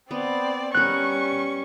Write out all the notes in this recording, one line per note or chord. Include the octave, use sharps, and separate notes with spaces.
B3 C4 D5
G3 B3 C#4 A#4 C#6 F#6